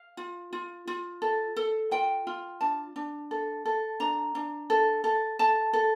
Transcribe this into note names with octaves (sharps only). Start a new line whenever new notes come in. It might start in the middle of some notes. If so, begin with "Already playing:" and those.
Already playing: F5
F4
F4
F4
A4
A4
F4 G5
F4
D4 A5
D4
A4
A4
D4 A#5
D4
A4
A4
A4 A5
A4